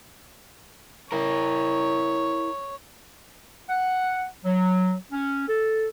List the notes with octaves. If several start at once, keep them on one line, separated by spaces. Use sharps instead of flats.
E4 A#4 C#5
F#5
F#3
C#4
A4